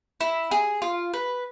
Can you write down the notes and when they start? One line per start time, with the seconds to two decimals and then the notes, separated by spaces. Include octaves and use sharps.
0.21 E4
0.51 G#4
0.82 F4
1.14 B4